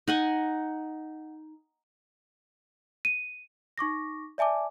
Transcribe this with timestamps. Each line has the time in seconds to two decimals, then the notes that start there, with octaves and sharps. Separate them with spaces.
0.08 D#4 F#5 G#5
3.05 D#7
3.78 D#4 C#6 D6 A#6
4.38 D5 E5 G#5 A5 D6